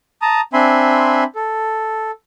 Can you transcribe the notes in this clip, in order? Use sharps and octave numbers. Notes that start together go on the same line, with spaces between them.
A5 A#5 D#6
C4 D4 E5 G#5 B5 C6
A4